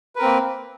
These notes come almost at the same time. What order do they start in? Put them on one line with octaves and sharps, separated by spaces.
B4 A#4 C4 A#3